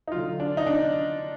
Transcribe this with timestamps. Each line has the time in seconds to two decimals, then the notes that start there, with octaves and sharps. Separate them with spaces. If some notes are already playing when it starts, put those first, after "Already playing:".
0.08 D#4
0.12 D3 F#3 F4
0.40 D4
0.57 D#4
0.67 D4